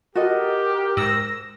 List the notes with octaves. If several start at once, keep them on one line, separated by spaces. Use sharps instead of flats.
F#4 G4 A4 A#4 D#5
G#2 E6 A#6